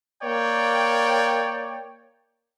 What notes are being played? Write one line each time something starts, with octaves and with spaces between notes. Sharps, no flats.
A#3 C#5 D5 G5